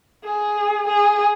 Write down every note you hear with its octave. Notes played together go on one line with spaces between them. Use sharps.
G#4
G#4